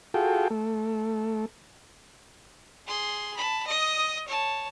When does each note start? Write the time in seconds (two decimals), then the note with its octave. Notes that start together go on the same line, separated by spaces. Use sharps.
0.14 F4 F#4 G#4 A4 G5
0.50 A3
2.87 G#4 C6
3.37 A5 B5
3.66 D#5 D#6
4.28 C#5 A5